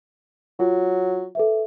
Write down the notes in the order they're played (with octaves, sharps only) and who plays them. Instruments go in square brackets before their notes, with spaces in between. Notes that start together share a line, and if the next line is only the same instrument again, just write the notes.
[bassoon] F#3 [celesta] F4
[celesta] A4 B4 E5